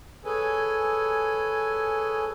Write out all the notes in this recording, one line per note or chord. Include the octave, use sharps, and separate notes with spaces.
G#4 A4 B4 C#5 G#5